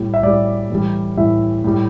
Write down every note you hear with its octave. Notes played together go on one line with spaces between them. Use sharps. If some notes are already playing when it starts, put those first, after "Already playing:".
Already playing: A2 G3
E5
A2 G3 D5
A2 E3 G3
A2 E3 G3 E5
A2 G3